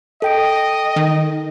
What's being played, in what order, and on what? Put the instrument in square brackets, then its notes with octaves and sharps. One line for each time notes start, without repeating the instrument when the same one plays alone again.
[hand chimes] A4 G5 D7 [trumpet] D#5
[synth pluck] D#3